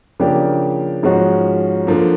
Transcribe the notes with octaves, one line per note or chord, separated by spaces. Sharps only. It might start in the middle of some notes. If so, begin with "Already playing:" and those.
C#3 F3 A#3 D4 G4
G#2 F3 G#3 C#4 F#4
D3 F3 A#3